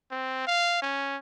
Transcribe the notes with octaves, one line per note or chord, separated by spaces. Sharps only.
C4
F5
C#4